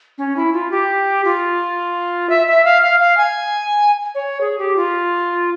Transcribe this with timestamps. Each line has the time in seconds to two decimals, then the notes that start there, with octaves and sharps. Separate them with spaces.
0.18 C#4
0.36 E4
0.53 F4
0.71 G4
1.24 F4
2.30 E5
2.47 E5
2.65 F5
2.82 F5
3.00 F5
3.17 G#5
4.15 C#5
4.41 G#4
4.59 G4
4.76 F4